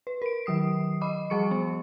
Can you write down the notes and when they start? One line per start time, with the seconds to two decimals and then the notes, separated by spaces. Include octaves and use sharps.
0.07 B4
0.22 A#4 D7
0.46 D#3 F#3 D#6 C7
1.01 D#5 B5 D6
1.30 F3 G3 G#4 C#6 C#7
1.51 B3